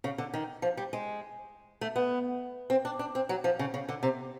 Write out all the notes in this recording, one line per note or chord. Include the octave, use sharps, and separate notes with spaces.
C#3
D3
D#3
F3
G3
G#3
A3
B3
C4
D4
D4
C4
F#3
F3
C#3
C#3
D3
C3